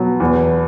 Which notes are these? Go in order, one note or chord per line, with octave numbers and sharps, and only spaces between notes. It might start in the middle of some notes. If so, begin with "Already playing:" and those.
Already playing: B2 F#3
E2